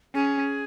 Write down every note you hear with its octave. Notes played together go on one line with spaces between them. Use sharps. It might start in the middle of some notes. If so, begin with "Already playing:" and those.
C#4 G#4